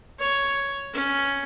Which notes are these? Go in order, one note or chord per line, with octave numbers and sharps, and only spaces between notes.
C#5
C#4